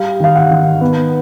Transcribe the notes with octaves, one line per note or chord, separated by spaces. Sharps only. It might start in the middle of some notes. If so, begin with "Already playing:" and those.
Already playing: G3 F5
D#3 F5
F#5
D#3
B3